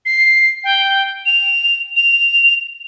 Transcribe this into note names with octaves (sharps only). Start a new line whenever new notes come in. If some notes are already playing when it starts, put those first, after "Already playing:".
C7
G5
F7
F7